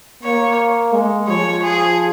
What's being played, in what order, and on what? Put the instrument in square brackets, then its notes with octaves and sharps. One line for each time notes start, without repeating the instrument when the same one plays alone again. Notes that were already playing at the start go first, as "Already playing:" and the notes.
[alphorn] A#3 [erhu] C#5
[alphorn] G#3
[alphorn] F3 [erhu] C#5
[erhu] G#4